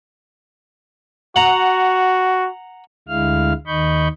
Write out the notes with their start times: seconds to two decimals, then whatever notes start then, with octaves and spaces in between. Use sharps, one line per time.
1.36 F#4 F#5 A#5
3.08 D2 D3 G#3 E4 F5 F6
3.67 D#2 D#3 D#5 B5 C#6 G6